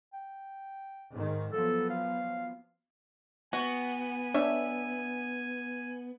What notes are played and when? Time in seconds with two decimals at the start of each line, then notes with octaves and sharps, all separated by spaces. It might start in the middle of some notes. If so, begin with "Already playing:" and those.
0.14 G5
1.11 G#2 D#3
1.52 F3 F#3 B3 A4
1.90 F5
3.53 B3 F#4 G#5
4.34 D4 C#5 E5